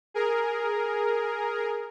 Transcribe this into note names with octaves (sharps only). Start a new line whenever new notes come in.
G#4 A#4